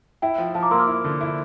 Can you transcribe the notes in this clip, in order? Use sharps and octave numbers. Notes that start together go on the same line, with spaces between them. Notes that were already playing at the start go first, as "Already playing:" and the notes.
E4 E5 G5
F3
F3 F5 A5
A#5 D6
A#3 C6 E6
D6 F6
E4
D3
E4